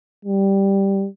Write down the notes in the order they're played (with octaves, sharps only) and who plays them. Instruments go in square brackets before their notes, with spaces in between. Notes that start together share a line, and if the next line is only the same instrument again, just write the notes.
[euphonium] G3